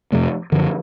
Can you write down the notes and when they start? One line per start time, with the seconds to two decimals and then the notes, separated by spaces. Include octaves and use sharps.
0.12 F2 C3 F3 A3
0.52 F#2 D3 F3